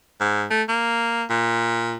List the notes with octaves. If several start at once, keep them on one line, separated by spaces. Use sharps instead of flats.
G#2
A3
A#3
A#2